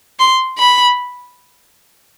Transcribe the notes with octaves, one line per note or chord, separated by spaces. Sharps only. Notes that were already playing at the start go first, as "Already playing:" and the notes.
C6
B5